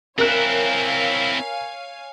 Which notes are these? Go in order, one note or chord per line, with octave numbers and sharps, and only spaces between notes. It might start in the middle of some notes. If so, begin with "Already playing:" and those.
C4 E4 A#4 C#5 F5 G#5 F#6